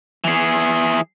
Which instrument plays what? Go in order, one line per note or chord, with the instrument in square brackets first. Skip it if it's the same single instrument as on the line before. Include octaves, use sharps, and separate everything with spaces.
[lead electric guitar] E3 G#4